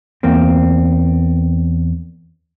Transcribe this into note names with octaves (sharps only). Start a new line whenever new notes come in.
E2 A#3 C4